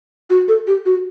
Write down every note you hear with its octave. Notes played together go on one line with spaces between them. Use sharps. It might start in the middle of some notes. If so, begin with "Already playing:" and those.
F#4
A4
G4
F#4